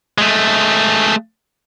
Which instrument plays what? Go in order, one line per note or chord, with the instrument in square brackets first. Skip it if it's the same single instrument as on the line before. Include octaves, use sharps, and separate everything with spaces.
[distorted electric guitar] G#3 A3